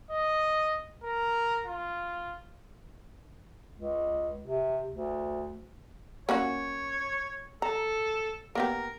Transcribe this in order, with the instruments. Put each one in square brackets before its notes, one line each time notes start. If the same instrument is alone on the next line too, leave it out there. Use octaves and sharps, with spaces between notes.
[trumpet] D#5
A#4
F4
[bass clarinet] C#2
C3
D2
[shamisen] A#3 C#4 F#4 [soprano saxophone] C#5
[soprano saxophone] A4 [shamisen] A#5
[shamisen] A#3 B3 G4 [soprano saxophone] A#4